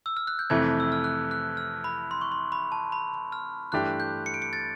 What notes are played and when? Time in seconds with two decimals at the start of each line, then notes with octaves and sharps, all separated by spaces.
0.06 E6
0.17 F6
0.27 F#6
0.39 G6
0.50 F2 C3 E3 A3 G#6
0.80 E6
0.92 F6
1.04 F#6
1.31 F#6
1.57 F6
1.84 B5
2.11 C6
2.21 C#6
2.32 C6
2.52 B5
2.72 A5
2.92 B5
3.32 F6
3.72 G2 E3 A3 D4 G4 F#6
4.00 G6
4.26 C#7
4.34 D7
4.42 C#7
4.53 A6